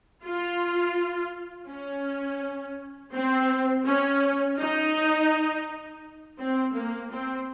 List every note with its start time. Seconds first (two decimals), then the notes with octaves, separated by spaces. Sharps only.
0.24 F4
1.68 C#4
3.13 C4
3.85 C#4
4.58 D#4
6.39 C4
6.75 A#3
7.11 C4